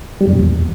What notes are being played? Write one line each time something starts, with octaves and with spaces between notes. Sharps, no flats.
G3
F#2
A#2
E2